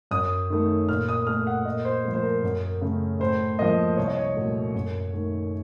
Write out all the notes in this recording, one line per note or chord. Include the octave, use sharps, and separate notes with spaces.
F#2 D#6
D#3 A3
A#2 F6
D#6
A3 F6
F#5
A#2 D#5
C5
F3 A3
C5
A#4
F#2
C#3 A3
A2 C5
F3 A#3 D#5
C2 C#5
D#5
C#5
A#2 F#3 A3
F#2
D#3 A3